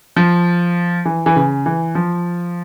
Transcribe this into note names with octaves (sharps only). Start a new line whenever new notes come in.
F3
E3
E3
C#3
E3
F3